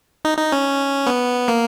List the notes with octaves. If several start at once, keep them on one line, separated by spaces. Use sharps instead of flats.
D#4
D#4
C#4
B3
A#3